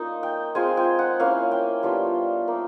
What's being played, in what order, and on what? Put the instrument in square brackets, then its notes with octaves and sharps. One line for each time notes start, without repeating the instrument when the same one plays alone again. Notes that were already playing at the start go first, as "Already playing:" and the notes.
Already playing: [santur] A#3 C#4 D#4 F4
G5
G#3 C4 F4 G#5
G5
F#5
A#3 C#4 E4 F5
G5
G3 B3 D4 F4
A#3 D#4